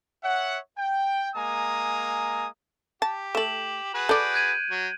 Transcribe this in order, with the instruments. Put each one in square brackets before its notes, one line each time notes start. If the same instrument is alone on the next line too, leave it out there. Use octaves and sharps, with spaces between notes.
[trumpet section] C#5 E5 F#5
G5
G#3 A#3 G#5 A#5 D#6
[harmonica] G4 [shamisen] A5
[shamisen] A3 A4 [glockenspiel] E7 F#7
[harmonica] F#4 G#4 B4
[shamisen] A4 D5 [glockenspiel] G6 D7
[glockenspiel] F#6 G#6 D#7
[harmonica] F#3